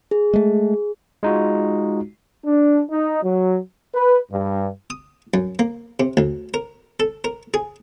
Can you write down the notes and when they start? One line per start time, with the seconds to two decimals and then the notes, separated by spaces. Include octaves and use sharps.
0.11 G#4
0.33 G#3 A3
1.23 G#3 D#4 F4 F#4
2.46 D4
2.91 D#4
3.24 F#3
3.94 B4
4.32 G2
4.90 D#6
5.34 F#2
5.59 A#3
6.00 C3
6.17 D2
6.54 A#4
7.00 A4
7.24 A#4
7.54 G#4